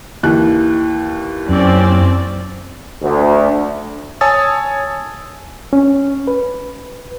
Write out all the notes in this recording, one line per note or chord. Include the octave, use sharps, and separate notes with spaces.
D#2 E3 F#6
F#2 C4 C#4 D5
D2
C#5 G#5 A5 D#6 E6 A6
C#4
B4